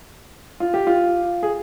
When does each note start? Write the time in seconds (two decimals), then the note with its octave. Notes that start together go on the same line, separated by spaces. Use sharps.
0.60 F4
0.74 G4
0.87 F4
1.43 G#4